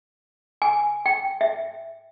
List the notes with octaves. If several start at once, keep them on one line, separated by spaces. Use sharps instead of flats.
G#5
G5
E5